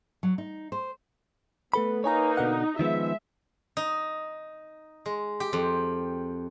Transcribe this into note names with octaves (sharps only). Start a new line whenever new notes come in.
F#3
D#4
C5
A3 B3 A4 B4 B5
A#3 D#4 B4 C#5 G#5 A#5
B2 D3 F#5
D#3 F3 G#3 B3 E5
D#4
G#3
G4
F2